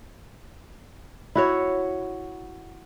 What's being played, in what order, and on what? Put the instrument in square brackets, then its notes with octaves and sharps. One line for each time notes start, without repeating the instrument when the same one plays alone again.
[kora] E4 F#4 C#5